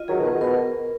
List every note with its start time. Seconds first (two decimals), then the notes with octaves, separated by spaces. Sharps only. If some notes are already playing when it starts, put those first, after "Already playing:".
Already playing: F4 D#5
0.08 D#3 F#3 G#4
0.19 B2 D#3
0.25 B3
0.30 B2 D#3
0.41 B2 A#4